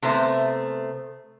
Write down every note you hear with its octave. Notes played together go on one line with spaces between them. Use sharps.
C3 A3 B3 C5